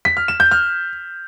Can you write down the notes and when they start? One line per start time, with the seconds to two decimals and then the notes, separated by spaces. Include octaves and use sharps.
0.05 B6
0.17 F6
0.28 E7
0.40 G6
0.51 F6